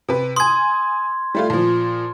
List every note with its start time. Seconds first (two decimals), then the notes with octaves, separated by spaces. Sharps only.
0.08 C3 B4
0.36 G#5 C6 D#6 G#6
1.35 G3 A3 F4
1.50 A#2 F3